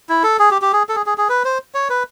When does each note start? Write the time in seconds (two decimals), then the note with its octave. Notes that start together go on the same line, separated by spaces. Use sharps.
0.09 E4
0.24 A4
0.39 G#4
0.51 G4
0.62 G4
0.73 G#4
0.89 A4
0.95 G#4
1.06 G#4
1.18 G#4
1.29 B4
1.45 C5
1.75 C#5
1.90 B4